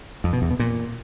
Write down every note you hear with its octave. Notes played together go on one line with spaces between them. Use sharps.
F2
B2
E2
B2
A#2